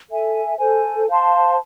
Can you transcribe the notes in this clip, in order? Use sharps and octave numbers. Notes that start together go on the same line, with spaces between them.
A4 E5 G#5
A4 C5 G#5
C5 F5 A5 C6